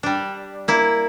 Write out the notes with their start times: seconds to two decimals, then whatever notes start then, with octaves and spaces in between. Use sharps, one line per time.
0.03 G3 D4
0.68 A#3 E4